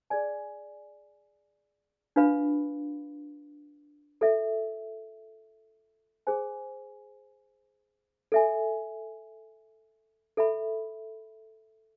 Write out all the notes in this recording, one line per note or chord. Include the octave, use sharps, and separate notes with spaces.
G#4 D5 G#5
D4 F4 B4 F5 B5
F4 A4 E5
G#4 C5 G#5
A4 E5 G#5
A4 E5 B5